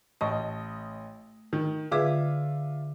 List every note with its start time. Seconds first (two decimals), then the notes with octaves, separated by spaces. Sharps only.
0.21 A1 A3 D#5 C#6
1.53 D#3
1.92 D3 F4 G#4 B4 E5 D6